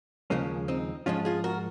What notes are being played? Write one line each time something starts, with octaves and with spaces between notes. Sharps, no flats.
D#2 C#3 F3 G#3 A#3 C#4
C4 D#4
G#2 F3 G#3 C#4 F4
F4 G#4
F#4 A#4